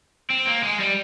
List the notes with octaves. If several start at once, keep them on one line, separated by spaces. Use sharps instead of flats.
C4
A#3
G#3
G3